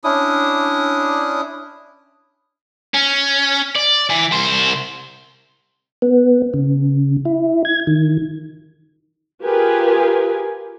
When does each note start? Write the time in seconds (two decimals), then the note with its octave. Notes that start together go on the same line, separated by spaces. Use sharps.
0.04 C#4 D4 E4 D#6
2.94 C#4
3.76 D5
4.10 E3
4.32 C2 C5
6.02 B3
6.54 C#3
7.25 E4
7.65 G#6
7.87 D#3
9.43 F4 G4 G#4 A#4 B4 G#5